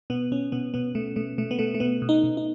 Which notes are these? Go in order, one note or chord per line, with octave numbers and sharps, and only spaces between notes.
B2 B3
B2 C#4
B2 B3
B2 B3
B2 A3
B2 A3
B2 A3
B3
B2 A3
A3
B2 B3
B2
D#4
B2
D#4